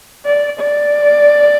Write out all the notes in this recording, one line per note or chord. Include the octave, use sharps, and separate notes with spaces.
D5
D5